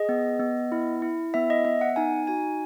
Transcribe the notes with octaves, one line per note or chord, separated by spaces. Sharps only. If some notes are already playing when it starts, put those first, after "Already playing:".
Already playing: G#4 D#5
B3
B3
E4
E4
B3 E5
D#5
B3 E5
F#5
D#4 G#5
F#4 G#5